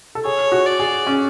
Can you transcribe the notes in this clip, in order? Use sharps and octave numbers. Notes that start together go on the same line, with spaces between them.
A4
G#4 C#5
F#4
D5
G#4
C#4